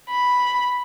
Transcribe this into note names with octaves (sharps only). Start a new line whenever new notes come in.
B5